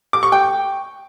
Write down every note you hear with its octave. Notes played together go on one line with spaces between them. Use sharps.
D6
C#6
G5